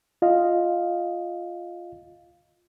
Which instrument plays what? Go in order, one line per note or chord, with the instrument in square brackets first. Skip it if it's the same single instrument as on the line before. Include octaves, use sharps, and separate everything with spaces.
[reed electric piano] F4 D#5 F5